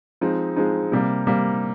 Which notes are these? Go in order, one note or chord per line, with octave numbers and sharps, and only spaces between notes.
F3 G#3 C4 D#4
F3 G#3 C4 D#4
C3 G3 A#3
C3 G3 A#3